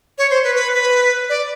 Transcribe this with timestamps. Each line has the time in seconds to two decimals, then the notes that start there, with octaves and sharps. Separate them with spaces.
0.18 C#5
0.31 C5
0.44 B4
0.55 B4
0.74 B4
1.29 D5